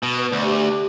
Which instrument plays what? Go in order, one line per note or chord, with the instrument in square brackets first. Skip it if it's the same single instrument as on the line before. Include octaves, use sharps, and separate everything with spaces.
[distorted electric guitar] B2
[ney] B4
[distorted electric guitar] D2 [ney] D5
[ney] G4